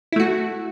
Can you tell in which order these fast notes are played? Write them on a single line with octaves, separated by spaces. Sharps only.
E4 A3 F#4